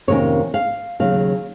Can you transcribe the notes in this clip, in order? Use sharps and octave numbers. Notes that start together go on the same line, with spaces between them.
F2 C3 D#3 A#3 C#4 C#5
F5
D#2 C#3 F#3 F5